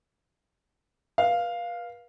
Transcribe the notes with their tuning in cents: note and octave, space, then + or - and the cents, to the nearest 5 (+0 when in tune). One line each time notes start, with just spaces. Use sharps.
B4 -35 F5 +0